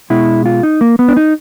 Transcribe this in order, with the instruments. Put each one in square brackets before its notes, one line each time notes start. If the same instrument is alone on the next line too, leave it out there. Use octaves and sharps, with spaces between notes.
[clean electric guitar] B2 G#3 E4
F4
D#4
A#3
B3
D4
D#4